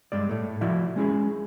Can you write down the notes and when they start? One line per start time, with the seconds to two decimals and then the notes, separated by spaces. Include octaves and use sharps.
0.12 G2 G#3 D5
0.29 A2 A3
0.61 F3 E4 F#4 D5 E5
0.96 G#3 C#4 E4 G#4